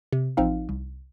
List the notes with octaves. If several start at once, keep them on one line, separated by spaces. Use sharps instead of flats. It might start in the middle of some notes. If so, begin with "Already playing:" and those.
C3
A1 F3 C4 D#4 F5
C2